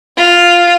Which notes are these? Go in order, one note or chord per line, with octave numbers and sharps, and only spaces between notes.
F4